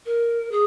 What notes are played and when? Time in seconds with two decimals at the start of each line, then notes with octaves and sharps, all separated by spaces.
0.06 A#4
0.51 G#4